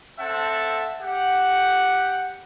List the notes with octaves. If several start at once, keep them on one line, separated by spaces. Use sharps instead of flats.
C4 A4 E5 F#5 A5
G4 F#5